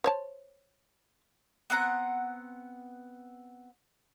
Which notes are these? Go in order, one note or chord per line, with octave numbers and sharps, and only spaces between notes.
C5 C#5 A5
B3 C4 F#5 A#5